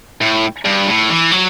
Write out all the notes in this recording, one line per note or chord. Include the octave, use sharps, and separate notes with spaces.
A2
G2
A2
E3
F#3